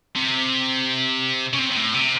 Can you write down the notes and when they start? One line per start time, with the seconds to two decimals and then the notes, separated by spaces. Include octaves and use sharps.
0.16 C3
1.53 C#3
1.59 C3
1.71 C3
1.76 A2
1.94 C3